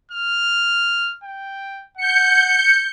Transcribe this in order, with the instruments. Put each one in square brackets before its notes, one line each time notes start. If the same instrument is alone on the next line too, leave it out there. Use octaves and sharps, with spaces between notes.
[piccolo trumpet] F6
G5
[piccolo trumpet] F#5 [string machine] G6 C#7